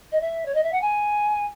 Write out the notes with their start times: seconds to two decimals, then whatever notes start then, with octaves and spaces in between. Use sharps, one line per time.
0.12 D#5
0.21 E5
0.45 C#5
0.54 D#5
0.63 E5
0.72 F#5
0.81 G#5